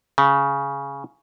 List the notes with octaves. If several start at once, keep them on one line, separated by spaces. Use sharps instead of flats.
C#3